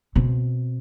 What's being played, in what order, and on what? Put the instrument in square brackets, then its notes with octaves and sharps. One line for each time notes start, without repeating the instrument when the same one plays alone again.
[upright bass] B2 C4